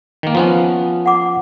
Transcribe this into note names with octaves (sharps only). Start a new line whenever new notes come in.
D#3 A#3
F3 B3 C#4
F#5 D6